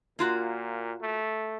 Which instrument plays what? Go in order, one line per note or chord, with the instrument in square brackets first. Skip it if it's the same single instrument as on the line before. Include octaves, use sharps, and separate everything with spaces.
[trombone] A#2 [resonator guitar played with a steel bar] A#3 F4 F#4
[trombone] A3